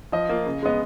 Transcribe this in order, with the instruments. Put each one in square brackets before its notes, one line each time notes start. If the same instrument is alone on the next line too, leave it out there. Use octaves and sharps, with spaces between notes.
[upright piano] F3 [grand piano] D#5
[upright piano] A#3 F4
C#3
[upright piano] G#3 B3 [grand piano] D#5